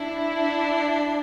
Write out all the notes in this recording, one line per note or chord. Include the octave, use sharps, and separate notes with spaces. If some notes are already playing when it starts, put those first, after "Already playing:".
Already playing: D4 E4
D4